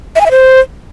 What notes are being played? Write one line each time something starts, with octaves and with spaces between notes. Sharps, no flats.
E5
G#5
E5
C5